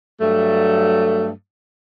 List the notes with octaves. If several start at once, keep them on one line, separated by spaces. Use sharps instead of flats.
G2 F#3 A3